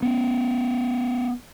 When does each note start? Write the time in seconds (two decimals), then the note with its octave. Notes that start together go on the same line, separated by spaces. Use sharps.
0.02 B3 C#4